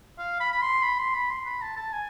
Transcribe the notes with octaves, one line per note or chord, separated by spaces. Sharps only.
F5
B5
B5
C6
B5
C6
B5
C6
B5
A5
A5
G#5